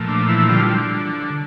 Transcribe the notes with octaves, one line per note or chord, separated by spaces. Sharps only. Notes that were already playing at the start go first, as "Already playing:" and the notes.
Already playing: A#2 F3 A3
D4
E3 E4
E4
D3 F3 G3 F4